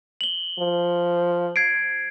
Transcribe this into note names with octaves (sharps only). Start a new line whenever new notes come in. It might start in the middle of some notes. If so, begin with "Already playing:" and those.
F#7 G7
F3
G#6 C7 D7